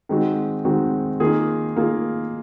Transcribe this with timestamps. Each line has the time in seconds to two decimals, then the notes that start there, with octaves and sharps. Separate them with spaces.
0.09 D#3 G#3 C4 F#4
0.65 D#3 G#3 C4 F#4
1.20 D#3 A#3 F4 G#4
1.76 D#3 A#3 F4 G#4